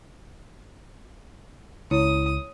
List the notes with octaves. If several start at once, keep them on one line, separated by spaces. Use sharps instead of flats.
C#2 E4 C#5 D#6